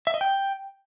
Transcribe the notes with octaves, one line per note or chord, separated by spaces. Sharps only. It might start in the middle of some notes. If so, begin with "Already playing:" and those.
E5
D#5
G5